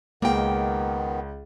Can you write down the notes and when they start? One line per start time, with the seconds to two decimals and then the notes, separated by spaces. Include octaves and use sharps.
0.22 C#2 D#3 A#3 B3 G5